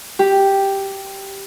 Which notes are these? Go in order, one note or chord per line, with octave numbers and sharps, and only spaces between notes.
G4